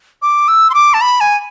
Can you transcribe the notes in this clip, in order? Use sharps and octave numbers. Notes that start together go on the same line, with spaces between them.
D6
E6
C6
D6
A5
B5
G#5